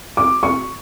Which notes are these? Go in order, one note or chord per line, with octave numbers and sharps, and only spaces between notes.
D6
C#6